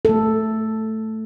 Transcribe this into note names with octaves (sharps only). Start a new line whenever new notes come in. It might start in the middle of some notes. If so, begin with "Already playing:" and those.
A3 A4